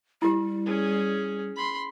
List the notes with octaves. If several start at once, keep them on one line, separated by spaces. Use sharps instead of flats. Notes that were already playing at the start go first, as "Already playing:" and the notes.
G3 E4 G4
C#4 G#4
B5 C6